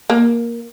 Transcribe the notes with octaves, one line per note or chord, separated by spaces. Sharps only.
A#3